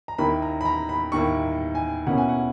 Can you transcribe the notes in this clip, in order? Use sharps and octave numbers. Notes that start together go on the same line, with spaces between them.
A#5
D#2 D#3 A#3 E4 B5
A#5
B5
A#5
B5
D#2 D#3 A#3 E4 C#6
G#5
B2 A#3 C#4 E4 F#5
G#5
F#5